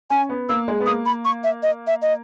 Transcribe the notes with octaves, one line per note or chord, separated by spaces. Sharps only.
C#4 G#5
B3
A#3 E6
G#3
B3
A#3 D#6
B5
C#6
E5
D#5
E5
D#5